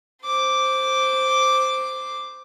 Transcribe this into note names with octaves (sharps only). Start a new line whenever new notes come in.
C5 D6